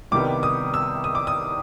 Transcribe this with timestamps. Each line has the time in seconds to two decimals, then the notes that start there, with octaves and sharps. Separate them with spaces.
0.11 C2 C3 D#3 G3 B3 D6
0.43 D#6
0.74 E6
1.04 D#6
1.15 D6
1.27 D#6